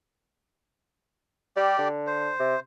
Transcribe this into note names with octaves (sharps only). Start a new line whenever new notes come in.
G3 G4 D5
D3
C5
C3